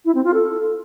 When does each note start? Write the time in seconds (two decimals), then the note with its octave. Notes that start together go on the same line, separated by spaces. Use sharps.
0.05 E4
0.15 C4
0.24 F4
0.34 A4